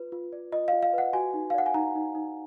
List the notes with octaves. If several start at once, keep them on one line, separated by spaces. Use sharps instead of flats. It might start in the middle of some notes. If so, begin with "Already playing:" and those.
Already playing: F4 B4
F4
D5
F4 D#5
F5
F4
F5
B4 F#5
F#4 G#5
D#4
F5
D5 F#5
G#5
D#4 A#5
D#4
D#4